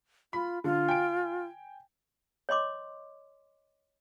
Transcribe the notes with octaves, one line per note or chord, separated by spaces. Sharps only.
F4 B5
D3 F4
G5 G#5 D7
C#5 D#5 C6 D6